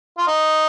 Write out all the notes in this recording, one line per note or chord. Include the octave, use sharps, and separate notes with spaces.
F4
D#4